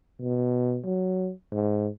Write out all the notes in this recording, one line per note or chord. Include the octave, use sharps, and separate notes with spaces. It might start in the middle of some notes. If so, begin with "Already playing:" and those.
B2
F#3
G#2